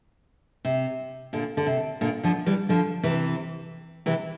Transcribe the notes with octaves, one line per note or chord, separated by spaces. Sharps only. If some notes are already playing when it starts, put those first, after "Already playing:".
C3
A#2 D3
D3
C3
A#2 D3
D3 F3
E3 G3
D3 F3
C3 E3
C3 E3